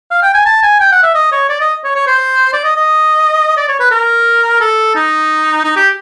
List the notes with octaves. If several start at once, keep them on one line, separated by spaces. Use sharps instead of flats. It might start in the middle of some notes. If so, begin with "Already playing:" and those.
F5
G5
G#5
A5
G#5
G5
F#5
E5
D#5
C#5
D5
D#5
C#5
C#5
C5
D5
D#5
D#5
D5
C#5
B4
A#4
A4
D#4
D#4
G4